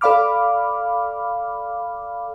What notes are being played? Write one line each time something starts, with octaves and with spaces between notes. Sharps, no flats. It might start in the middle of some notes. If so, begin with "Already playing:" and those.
A4 D5 F5 B5 D6 F6